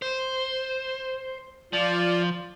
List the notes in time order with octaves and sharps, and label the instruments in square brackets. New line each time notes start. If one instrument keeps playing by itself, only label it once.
[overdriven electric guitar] C5
[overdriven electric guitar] F3 [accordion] F4 D5